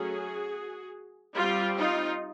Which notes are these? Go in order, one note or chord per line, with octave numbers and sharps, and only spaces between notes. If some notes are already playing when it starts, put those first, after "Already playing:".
Already playing: F#3 A3 C#4 F#4 G#4
G3 C4 F4 G4
D#4 F4